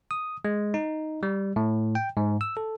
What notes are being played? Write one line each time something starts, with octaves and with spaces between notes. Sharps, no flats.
D#6
G#3
D#4
G3
A2
G5
G#2
E6
A4